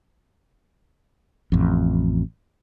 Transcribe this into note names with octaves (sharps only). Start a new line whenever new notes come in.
A1 F2